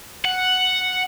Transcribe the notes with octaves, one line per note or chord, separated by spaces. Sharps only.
F#5